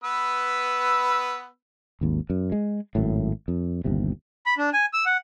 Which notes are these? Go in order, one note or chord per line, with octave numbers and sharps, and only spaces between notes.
B3 B4 E6
G#1 D#2
F#2
G#3
G#1 F#2 A2
F2
G1 D#2 C3
B5
D4
G#5
E6
F#5